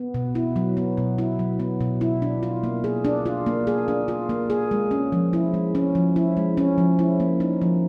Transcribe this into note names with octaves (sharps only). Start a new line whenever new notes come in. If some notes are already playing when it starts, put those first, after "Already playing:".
Already playing: B3
B2
E4
F#3
B3
B2
E4
F#3
B3
B2
E4
D4
F4
A#3
G#4
D4
F4
A#3
G#4
D4
F4
A#3
G#4
G#3
C#4
F3
E4
G#3
C#4
F3
E4
G#3
C#4
F3
E4
A#3
D#4
F3